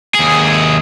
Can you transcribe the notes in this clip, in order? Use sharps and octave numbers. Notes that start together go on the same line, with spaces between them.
D#2 G#4